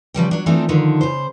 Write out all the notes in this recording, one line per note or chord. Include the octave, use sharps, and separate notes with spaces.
C#3 F3 G3 G5
F#3 D4
E3 A3 C4 D4 D#4 F4
D3 D#3 F3 D#4
C#3 C5